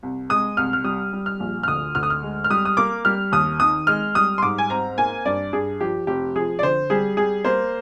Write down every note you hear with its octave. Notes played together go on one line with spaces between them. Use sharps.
C2
G#3 D#6
C2 F6
F6
G3 D#6
G3
F6
A#1
F6
D2 D#6
D2 F6
D#6
F6
G#3
F6
G3 D#6
D#6
A#3 D6
G3 F6
D#2 D#6
D#3 D#6
G#3 F6
G3 D#6
C6
G#2 D6
G#5
C4 A#5
A#3 G#5
G2 D5
G2 G#4
F3 G4
F1 G4
F3 G#4
D5
D3 C5
G3 G#4
G3 G#4
A#3 C5